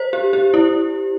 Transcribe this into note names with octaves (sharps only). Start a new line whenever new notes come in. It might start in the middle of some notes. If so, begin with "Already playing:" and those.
Already playing: C5
G4
G4
E4